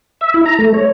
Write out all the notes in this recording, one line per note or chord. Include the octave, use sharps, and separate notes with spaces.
E5
E4
A#5
A3
C#5